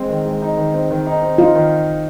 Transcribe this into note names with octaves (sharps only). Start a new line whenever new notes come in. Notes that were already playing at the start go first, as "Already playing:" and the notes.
Already playing: G#3 C4
D#3
G#3
D#4
D#3
C4
D#3
D#4
C4
D#4 F4
D#3